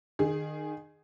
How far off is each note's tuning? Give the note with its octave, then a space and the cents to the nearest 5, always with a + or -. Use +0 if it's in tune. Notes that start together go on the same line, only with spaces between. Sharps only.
D#3 -25 G#4 +0